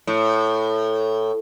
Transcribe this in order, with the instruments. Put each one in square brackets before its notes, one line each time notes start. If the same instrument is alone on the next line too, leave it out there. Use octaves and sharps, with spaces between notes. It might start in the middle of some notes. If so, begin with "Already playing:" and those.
[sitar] A2